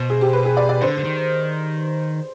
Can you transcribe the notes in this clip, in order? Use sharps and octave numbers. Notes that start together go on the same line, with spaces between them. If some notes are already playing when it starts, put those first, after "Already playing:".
Already playing: B2 C5
G#4
G4
B4
G#4
D5
D5
D3 C5
D3
D#3